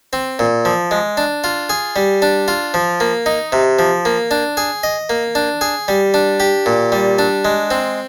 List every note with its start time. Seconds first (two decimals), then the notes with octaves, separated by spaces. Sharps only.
0.13 C4
0.39 A#2
0.65 F3
0.91 G#3
1.17 D4
1.44 F4
1.69 G#4
1.96 G3
2.22 D4
2.48 F4
2.74 F3
3.00 A#3
3.26 D#4
3.52 C3
3.79 F3
4.05 A#3
4.31 D4
4.57 G#4
4.83 D#5
5.09 A#3
5.35 D4
5.61 G#4
5.88 G3
6.14 D4
6.40 G4
6.66 A#2
6.92 G3
7.19 D4
7.45 G#3
7.71 C4